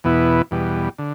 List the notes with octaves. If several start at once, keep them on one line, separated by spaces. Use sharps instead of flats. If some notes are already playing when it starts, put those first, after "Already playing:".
E2 B2 B3 E4
E2 B2 G3
D3